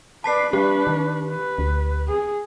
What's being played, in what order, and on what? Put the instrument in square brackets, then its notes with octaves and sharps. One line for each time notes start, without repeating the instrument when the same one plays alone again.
[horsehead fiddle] B4 D5 [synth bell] A5 B6 C7
[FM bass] G3 [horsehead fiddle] D4 B4 [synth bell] G4
[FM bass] D#3
[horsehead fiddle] B4
[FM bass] D2
[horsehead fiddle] G#4